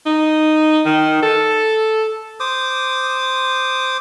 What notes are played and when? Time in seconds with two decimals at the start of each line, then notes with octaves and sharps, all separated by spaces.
0.06 D#4
0.86 D#3
1.23 A4
2.40 C5 D6 D#6